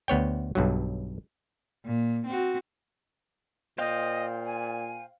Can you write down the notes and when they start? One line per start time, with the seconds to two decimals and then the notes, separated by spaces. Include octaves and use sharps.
0.08 D2 B3 C#5 G5
0.55 B1 G2 F#3
1.86 A#2
2.27 C4 F#4
3.78 A#2 C5 D#5 F5 G5
4.45 G#5